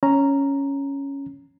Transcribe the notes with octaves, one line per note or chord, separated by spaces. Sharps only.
C#4 A#5